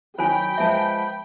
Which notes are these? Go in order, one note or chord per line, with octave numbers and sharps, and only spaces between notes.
D#3 F#3 C5 G5 G#5 B5
F3 G#3 B3 E5 A5